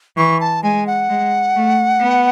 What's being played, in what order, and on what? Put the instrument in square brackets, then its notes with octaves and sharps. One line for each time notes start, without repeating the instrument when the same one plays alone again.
[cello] E3 [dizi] C#6
[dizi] A5
[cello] G#3 [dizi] G#5
[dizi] F#5
[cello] G#3
A3
B3